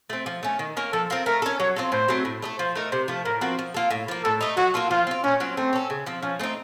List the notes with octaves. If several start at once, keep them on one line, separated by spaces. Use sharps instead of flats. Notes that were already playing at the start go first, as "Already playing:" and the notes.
A3 C4
F3
A3 C#4
D#3
A#3 C#4
F3 A4
C4 F4 A#4
A3 A#4
C#4 A4
F#3 C#5
C4 F4 A4
A2 C5
F#3 A3 C4
A2
A3 D#4 A4
F3 C5
A3 D#4 A#4
C3 C5
F3 A3
A2 A#4
F3 C4 F#4
F3
A#3 F4 A4
A2
F3 A#3
A2 A4
A3 D#4
F#3 F#4
A#3 F4 A4
F3 F4
C4 F4
A#2 C#4
F#3 C4 F4
A3 C4
C#4 A4
C#3
F3 C4
F3 C#4
A3 C4 D#4